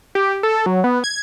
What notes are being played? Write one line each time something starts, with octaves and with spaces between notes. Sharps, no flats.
G4
A4
F#3
B3
G#6